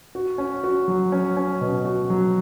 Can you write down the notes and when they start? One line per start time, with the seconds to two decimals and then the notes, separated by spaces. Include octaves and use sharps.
0.15 F#4
0.38 C#4
0.64 F#4
0.88 F#3
1.12 C#4
1.37 C#4
1.61 B2
1.85 F#4
2.10 F#3